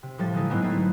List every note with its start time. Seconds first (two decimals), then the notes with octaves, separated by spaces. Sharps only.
0.03 C3
0.18 A2 F3 G3 A6
0.33 D3 G#3 D#4 E4
0.50 G#2 F#3 B3 C4 E4
0.62 A3 B3 C4 D#4 E4
0.76 F#4